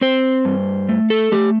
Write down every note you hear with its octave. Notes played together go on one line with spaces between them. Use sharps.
C4 C5
G2
A3
A4
A3 G4